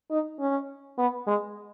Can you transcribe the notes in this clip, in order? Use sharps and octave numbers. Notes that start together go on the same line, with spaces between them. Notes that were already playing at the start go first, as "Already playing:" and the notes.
D#4
C#4
B3
G#3